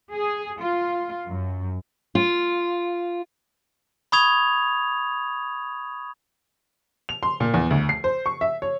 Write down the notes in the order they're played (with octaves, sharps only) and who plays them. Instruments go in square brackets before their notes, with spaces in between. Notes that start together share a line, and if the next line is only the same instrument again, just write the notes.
[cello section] G#4
F4
F#2
[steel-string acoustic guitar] F4
[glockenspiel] B5 C#6 D#6 G#6 F7
[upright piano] F7
C6
A#2
E2
D2
C7
C5
C#6
E5
C#5